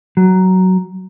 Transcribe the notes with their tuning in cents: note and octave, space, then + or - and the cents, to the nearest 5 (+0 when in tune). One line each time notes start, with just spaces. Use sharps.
F#3 +10